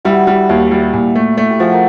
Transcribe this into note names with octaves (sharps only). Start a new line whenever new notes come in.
G3 E4 F#4
G3 E4 F#4
D#2 E4 F#4
G3
A#2
A3
A3
G4
F3 F#4 G#4
A#4